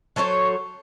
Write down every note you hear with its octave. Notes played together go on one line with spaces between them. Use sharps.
F#3 A4 C5 C#5